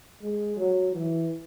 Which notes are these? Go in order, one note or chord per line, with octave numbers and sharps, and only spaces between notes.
G#3
F#3
E3